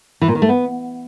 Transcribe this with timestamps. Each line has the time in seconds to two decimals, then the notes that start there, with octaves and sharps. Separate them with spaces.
0.21 E3
0.28 A#2
0.35 D#3
0.42 A3
0.49 B3